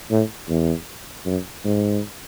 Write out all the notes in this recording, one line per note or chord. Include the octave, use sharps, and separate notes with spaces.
A2
E2
F#2
G#2